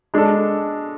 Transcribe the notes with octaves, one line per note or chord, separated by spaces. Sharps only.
G#3 D4 A4